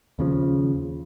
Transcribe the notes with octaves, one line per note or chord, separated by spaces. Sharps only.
D#2 C#3 F3